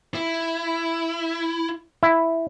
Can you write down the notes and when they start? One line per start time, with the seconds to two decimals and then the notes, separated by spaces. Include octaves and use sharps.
0.14 E4
2.03 E4